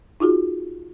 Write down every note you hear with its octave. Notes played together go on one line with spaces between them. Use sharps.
D#4 F4 F#4 G#4